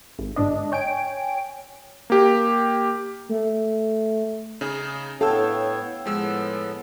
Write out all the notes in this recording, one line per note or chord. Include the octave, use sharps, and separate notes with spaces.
G#1
G1 G#2 D4 D#5
C#5 G5 G#5 D7
A#3 G4
A3
C#3 D#4 G#4
A2 B3 A4 C#5 F5 G5 E6
A2 F3 G#3 B3 E6